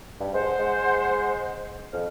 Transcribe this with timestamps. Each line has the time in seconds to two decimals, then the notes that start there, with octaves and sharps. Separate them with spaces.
0.20 G2
0.34 G#3 C5 F#5
0.58 G#3
1.93 F2 F6